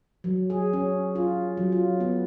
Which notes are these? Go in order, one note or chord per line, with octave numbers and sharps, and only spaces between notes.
F#3
G#4
C#4
F4
F#3
F4
B3